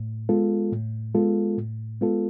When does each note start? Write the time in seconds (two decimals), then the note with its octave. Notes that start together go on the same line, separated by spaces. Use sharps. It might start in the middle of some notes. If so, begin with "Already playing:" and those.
Already playing: A2
0.29 G#3 B3 F4 A4
0.72 A2
1.15 G#3 B3 F4 A4
1.58 A2
2.01 G#3 B3 F4 A4